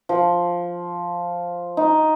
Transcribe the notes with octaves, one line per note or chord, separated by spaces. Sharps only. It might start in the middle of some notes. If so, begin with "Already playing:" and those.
F3
D#4